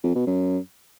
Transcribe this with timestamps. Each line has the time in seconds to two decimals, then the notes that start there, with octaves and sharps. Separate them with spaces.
0.04 F2
0.15 B2
0.27 F#2